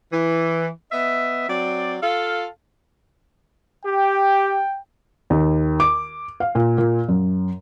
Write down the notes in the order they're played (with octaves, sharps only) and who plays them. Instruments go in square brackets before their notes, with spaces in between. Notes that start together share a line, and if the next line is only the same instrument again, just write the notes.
[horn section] E3
B3 D#5 E5
F#3 C4 D5
F4 A4 F5
[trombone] G4 [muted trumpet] G5
[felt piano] D#2
D6
F5
A#2
A#2
F#2